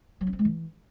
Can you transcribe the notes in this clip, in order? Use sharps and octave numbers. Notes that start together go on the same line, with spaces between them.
F#3
C#4
C4
G#3
E3